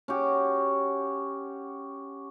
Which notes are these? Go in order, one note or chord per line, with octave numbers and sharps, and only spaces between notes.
C#4 F#4 G4